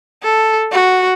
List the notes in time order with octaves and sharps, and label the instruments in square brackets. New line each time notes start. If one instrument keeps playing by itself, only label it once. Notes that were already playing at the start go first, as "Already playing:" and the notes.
[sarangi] A4
F#4